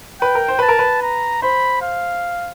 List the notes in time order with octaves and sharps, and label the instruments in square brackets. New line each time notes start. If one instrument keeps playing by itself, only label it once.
[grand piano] B4 [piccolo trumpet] G5
[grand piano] A#4
C5
[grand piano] B4 [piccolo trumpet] A5
[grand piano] A#4
B4
[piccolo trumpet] A#5
[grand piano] C5 [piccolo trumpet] B5
[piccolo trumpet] F5